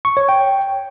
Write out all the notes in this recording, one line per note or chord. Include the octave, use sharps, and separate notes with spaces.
C#6
C#5
G5